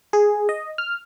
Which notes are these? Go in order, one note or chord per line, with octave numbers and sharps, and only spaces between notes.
G#4
D#5
F6